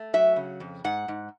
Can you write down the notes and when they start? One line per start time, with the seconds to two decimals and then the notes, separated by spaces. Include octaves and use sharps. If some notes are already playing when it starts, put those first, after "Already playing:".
Already playing: A3
0.14 F#3 E5
0.36 C#3
0.60 F2
0.84 G#2 F#5
1.08 G#2